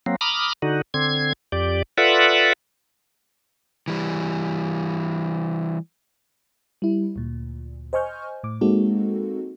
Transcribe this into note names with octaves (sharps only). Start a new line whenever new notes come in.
F#3 A#3 C4
A#5 B5 D6 D#6 F6
D3 D#4 F#4
D3 C4 G#6
F2 G4 D5
F4 A4 B4 D5 E5 F#5
E3 G3
G3 E4
D2 A#2
C5 D#5 G#5 C#6 F6 G6
A2 D6
G#3 A#3 C4 D#4 F#4 A4